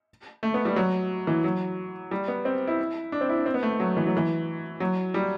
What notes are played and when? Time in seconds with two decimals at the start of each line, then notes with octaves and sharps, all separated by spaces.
0.43 A3
0.54 B3
0.65 G3
0.76 F#3
1.27 E3
1.44 F#3
2.11 G3
2.28 B3
2.45 C4
2.67 E4
3.12 D4
3.21 C4
3.29 E4
3.38 D4
3.46 C4
3.54 B3
3.63 A3
3.80 F#3
3.97 E3
4.07 F#3
4.17 E3
4.80 F#3
5.14 G3